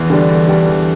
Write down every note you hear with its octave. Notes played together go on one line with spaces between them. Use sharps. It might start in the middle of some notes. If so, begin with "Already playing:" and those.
Already playing: E2
D3 G3 D4
E2
D3 G3 D4
E2